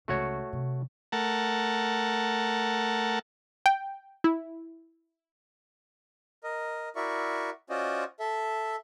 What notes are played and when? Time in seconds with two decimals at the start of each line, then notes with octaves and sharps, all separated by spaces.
0.08 C#2 C#3 A3 F#4 C#5
0.53 C3
1.12 A3 A#4 F#5 A5
3.66 G5
4.24 E4
6.44 A#4 D#5
6.96 E4 F#4 A#4 D5 E5 C#6
7.70 C#4 F4 F#4 C5 D5 D#5
8.20 A4 E5